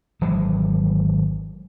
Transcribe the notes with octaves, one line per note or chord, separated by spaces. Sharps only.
G#1 E3 F#3 G#3